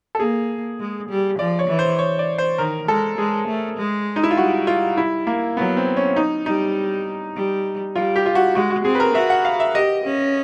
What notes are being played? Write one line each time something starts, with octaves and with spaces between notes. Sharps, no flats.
A4
A#3 G#4
G#3
G3
F3 D5
C#5
E3
C5
C#5
D5
C5
D#3 A#4
G#3 A4
G#3 G#4
A3
G#3
D#4
E4
F4
G3 F#4
F4
E4
A#3
F#3 B3
C4
C#4
D#4
G3 D#4
G3
G3 F4
G4
F4
F#4
G#3 F#4
F#4
C4 G#4
B4
A#4
F#4 E5
F#5
F5
E5
G4 D#5
C#4